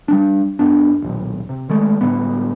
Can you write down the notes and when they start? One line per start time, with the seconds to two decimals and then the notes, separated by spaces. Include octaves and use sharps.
0.08 G3 G#3 D4
0.59 F#2 B3 D4
1.02 D#1 B1
1.49 C3
1.70 D#3 G#3 A3
2.01 A2 D3 G3 B3